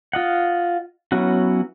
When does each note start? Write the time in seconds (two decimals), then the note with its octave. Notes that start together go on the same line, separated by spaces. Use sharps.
0.13 F4 D#5 F#5
1.12 F#3 B3 C#4 E4 F#4